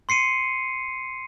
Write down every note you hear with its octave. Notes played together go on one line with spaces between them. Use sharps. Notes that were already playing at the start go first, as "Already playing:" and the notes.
C6 C7 C#7 D#7